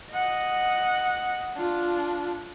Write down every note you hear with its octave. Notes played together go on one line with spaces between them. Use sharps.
D#5 F#5
D4 F4